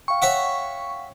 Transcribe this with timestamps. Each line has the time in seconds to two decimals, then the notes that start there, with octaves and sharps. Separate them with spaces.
0.08 F5 G5 C#6
0.22 C#5 E5 F#5